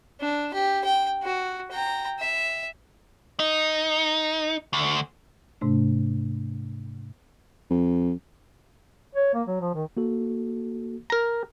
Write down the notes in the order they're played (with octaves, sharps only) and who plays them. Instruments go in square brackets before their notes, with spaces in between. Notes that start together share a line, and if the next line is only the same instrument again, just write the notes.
[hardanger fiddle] D4
G4
G5
F#4
G5 A#5
E5
[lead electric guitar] D#4
D2
[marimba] G#2 C3 A3 D4
[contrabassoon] F2
[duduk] C#5
A#3
F#3
F3
D#3
[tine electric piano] A#3 F#4 A4
[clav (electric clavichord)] A#4 A#5